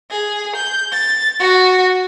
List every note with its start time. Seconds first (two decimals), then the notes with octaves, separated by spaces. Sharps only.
0.10 G#4
0.55 G6
0.92 A6
1.39 F#4